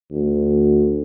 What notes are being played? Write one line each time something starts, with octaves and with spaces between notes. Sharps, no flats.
D2